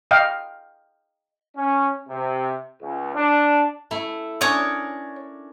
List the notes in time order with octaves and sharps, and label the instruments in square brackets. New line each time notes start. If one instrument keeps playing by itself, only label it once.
[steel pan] D#5 F5 G5
[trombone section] C#4
C3
C#2
D4
[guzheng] A3 E4
[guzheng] C#4 D4 A#4 [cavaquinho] C#5 D#6